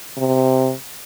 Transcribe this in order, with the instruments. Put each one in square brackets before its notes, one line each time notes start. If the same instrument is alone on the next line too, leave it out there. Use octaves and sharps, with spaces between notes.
[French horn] C3